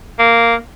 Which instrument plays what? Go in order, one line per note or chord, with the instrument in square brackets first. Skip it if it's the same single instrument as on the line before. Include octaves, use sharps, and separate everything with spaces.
[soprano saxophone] A#3